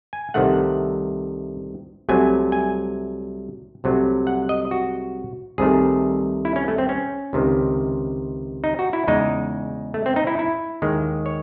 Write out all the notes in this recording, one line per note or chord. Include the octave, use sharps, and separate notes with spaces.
G#5
C2 C3 D#3 A3 F#5
C2 C3 F#3 A3 G#5
G#5
C2 C3 F#3 A3
F#5
D#5
F#4
C2 C3 D#3 A3 G#4
E4
C#4
A3
C4
C#4
C#2 C3 D#3
D#4
F#4
E4
E2 C#3 G#3 D#4
A3
C4
D#4
E4
E4
D#2 D#3 G#3
C#5